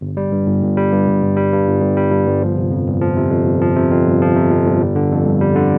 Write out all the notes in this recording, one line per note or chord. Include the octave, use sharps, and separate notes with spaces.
G1
G3
G2
G1
G1
G3
G2
G1
G1
G3
G2
G1
G1
G3
G2
G1
F3
C3
F2
G1
F3
C3
F2
G1
F3
C3
F2
G1
F3
C3
F2
G1
G3
D3
F2
G1
G3
D3